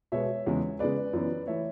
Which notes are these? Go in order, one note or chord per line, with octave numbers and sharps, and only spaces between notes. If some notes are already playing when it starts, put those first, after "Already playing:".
B2 G#3 B3 C#5 E5
E2 C#3 G#3
C#3 G#3 B3 B4 D5
F#2 E3 B3
E3 A3 C#5 E5